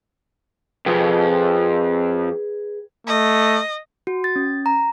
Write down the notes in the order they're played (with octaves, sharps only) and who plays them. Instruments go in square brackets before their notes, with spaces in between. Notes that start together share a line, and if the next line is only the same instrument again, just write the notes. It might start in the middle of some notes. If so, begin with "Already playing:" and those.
[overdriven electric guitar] F2 [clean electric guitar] G#4 B4 G5
[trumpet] A3 [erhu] D#5
[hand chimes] F#4
A6
C#4
A#5